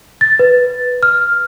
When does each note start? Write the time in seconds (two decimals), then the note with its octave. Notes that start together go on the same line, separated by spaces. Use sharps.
0.21 A6
0.39 B4
1.03 F6